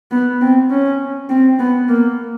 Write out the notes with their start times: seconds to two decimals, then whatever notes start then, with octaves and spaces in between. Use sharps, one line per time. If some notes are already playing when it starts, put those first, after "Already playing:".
0.11 B3
0.41 C4
0.71 C#4
1.29 C4
1.59 B3
1.89 A#3